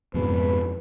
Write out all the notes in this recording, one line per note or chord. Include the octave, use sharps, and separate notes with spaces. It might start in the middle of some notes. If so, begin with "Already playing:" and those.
F2 G#2 B2 B4